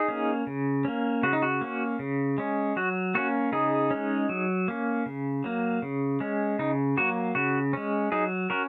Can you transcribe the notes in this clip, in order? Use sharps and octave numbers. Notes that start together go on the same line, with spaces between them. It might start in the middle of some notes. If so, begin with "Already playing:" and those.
Already playing: D#4 G#4
A#3 C#4
C#3
A#3 C#4
C#3 F#4
D#4
F#4
A#3 C#4
C#3
G#3 C#4
F#3 F#4
A#3 C#4 F#4
C#3 D#4 G#4
G#3 C#4
F#3
A#3 C#4
C#3
F#3 A#3
C#3
G#3 C#4
C#3 D#4
F#3 A#3 F#4
C#3 F#4
G#3 C#4
F#3 D#4 G#4
C#4 F#4 A#4